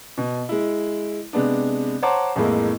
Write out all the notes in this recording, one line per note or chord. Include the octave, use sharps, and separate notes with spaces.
B2
G#3 E4
C3 G#3 B3 D4
C5 C#5 F#5 A5 A#5 D6
F2 A2 E3 G#3 A#3 E4